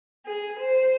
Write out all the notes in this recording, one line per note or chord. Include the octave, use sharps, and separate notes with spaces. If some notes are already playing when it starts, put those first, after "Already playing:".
G#4
C5